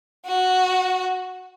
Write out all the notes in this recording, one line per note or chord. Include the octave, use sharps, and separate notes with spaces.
F#4